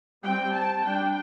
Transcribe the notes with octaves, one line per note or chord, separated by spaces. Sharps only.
G3 C4 G5
A5
G3 D4 G5